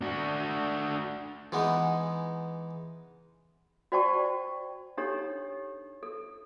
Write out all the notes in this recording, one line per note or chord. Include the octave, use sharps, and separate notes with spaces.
D4 F#4
E3 G#3 B3 D#4
F#4 C5 D5 G5 A5 C#6
D4 D#4 G4 A4 C#5
A4